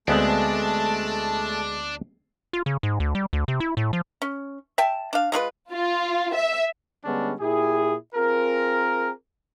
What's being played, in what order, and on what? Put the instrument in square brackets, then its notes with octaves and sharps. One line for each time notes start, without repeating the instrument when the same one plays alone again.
[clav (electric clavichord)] D2 B3 C4 [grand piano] G#3 [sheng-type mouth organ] A3 A5 [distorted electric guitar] D4
[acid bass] F4
C#3
G#2
D2
G3
D2
C3
E4
A2
F3
[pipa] C#4
E5 G5 A5
D4 F5
G#3 A3 F4 B4
[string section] F4
E5
[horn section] D3 G3 G#3 B3 C#4 D4
A#2 E4 G4 G#4
C4 F4 G#4 A#4